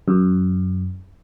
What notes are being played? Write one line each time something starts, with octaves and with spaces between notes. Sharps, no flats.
F#2